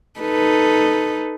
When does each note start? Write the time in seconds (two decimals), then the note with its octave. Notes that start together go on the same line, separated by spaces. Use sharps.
0.20 D#4 A4 B4